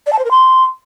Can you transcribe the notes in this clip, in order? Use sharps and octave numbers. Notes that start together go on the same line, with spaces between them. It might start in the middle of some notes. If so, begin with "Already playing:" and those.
D5
A5
C5
A#4
C6